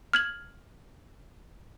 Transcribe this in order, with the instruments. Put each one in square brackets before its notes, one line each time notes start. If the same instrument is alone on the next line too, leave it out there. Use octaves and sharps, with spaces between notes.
[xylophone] F6 G#6 F#7